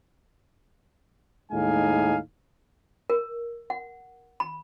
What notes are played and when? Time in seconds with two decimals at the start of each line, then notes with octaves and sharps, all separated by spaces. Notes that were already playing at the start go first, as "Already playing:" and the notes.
1.51 D#2 A2 G#3 D#4 F5 G#5
3.10 A#4
3.70 F#5
4.40 B5